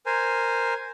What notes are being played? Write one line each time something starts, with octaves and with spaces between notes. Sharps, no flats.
A#4 C5 G#5